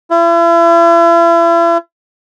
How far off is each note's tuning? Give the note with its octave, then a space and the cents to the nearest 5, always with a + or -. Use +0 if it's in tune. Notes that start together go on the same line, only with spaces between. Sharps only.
E4 +40